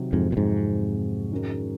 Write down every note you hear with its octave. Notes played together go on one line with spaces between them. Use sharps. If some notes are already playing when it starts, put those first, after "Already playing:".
Already playing: C3 D#3 F#3
F2 G#2
A#2
F2 G#2
D#3 G#3 C#4 F#4 A#4